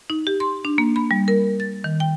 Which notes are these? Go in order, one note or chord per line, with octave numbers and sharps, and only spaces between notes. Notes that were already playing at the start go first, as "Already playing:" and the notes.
D#4
G4
C6
D4
A#3
B5
G3
A#4
A6
D#3
G5